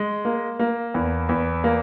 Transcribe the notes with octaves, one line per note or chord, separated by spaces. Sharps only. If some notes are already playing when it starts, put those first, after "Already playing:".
Already playing: G#3
A#3
A#3
E2
E2
A#3